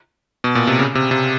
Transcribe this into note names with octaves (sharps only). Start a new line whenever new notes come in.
B2
A#2
C3
C#3
C3
C3